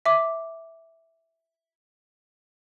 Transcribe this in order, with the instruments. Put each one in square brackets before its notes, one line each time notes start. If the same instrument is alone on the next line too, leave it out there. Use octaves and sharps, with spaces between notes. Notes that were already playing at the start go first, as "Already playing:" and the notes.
[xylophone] E5 D6